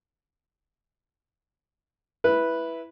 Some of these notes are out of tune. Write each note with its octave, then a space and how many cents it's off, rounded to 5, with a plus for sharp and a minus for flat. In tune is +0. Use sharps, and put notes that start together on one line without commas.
E4 +0 B4 -5